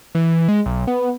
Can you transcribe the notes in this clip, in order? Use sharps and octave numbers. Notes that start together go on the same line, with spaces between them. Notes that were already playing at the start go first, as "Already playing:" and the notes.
E3
G#3
B1
B3